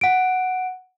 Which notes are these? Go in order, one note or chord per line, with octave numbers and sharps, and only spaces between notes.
F#5 D7